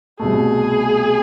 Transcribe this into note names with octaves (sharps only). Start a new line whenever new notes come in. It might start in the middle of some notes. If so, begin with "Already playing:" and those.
C2 B2 A3 G#4